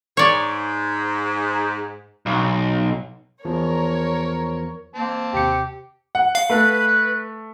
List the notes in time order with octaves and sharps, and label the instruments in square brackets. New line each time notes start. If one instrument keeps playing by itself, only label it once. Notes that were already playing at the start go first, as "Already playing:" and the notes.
[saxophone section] G#2 [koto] C#5 D5
[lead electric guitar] B1
[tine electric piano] E2 F3 [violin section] A#4 C#5
[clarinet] A#3 [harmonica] C4 A5
[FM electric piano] D#2 C3 C#7 [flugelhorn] G4
[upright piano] F#5
[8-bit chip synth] F5
[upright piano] A3 [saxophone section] B4